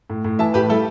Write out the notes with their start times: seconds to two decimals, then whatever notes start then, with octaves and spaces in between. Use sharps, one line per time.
0.10 A2
0.24 A2
0.39 E3 E5 A5
0.54 A2 G4 B4
0.69 G3 E4 A4